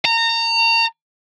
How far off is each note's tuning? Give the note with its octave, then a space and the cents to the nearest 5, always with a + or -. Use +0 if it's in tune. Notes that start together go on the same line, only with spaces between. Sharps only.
A#5 -25